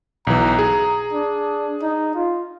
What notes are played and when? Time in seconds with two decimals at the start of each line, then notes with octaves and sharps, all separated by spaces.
0.27 B1 E3 A#5
0.59 G#4
1.13 D4
1.82 D#4
2.15 F4